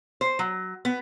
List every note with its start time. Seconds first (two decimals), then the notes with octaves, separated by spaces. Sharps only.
0.21 C5
0.39 F#3
0.85 B3